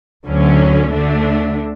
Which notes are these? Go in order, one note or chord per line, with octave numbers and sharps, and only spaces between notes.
D2 D3 F#3 C#4
D2 D3 A3 D4